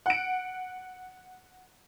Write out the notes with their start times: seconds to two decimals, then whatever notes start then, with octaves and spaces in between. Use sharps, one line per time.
0.06 F#5 D7